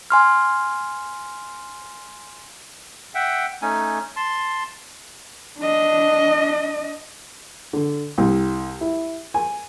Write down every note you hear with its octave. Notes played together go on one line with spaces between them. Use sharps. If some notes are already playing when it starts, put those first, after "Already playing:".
G#5 C6 F6
E5 F#5 G5
A3 C#4 D#4 G#5
A5 C6
D4 D#5
D3
C2
E4
G#5